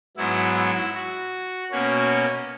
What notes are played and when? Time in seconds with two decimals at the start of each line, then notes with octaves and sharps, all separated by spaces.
0.17 G#2 F#3 B3 E4
0.55 E4
0.95 F#4
1.72 B2 A#3 C#4 F#4